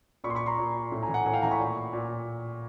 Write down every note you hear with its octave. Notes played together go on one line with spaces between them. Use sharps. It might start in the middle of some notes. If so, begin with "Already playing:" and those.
A#2 B5 C#6
C6
B5 C#6
A#5 C6
A#2
A2
G#5 A#5
E3
F#5 G#5
A2 F#5 G#5
F5 G5
E3 G#5 A#5
B5 C#6
A#2
A#2